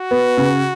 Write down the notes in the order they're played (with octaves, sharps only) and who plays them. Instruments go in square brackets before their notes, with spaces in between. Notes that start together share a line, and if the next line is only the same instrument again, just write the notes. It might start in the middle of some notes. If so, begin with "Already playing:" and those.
Already playing: [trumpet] F#4
[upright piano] B3
C#3